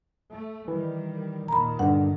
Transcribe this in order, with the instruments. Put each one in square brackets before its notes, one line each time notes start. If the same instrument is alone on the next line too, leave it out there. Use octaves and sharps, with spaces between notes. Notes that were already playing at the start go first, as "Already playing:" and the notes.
[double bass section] A3
[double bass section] D#3 G3 [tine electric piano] E3
[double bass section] D#2 A#2 D#3 [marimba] A#5 B5
[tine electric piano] G2 D3 [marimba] F#5